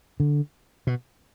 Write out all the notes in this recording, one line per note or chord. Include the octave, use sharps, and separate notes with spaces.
D3
B2